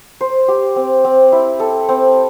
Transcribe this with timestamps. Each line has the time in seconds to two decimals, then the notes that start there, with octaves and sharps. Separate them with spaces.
0.21 C5
0.48 G4
0.76 C4
1.05 C4
1.32 E4
1.59 A4
1.89 C4